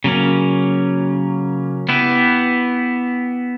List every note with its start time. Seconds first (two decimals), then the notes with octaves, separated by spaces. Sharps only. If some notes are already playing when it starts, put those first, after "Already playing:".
0.04 C#3 F#3 A#3 C#4
1.89 B3 E4 G4 B4